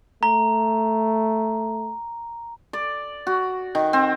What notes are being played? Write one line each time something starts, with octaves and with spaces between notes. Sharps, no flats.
A3 A#5
D5
F#4
D#3
C4